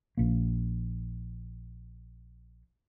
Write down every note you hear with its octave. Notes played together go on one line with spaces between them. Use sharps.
A#1 A#3